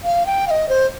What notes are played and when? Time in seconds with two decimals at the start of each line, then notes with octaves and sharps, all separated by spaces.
0.04 F5
0.26 G5
0.47 F5
0.51 D#5
0.69 C5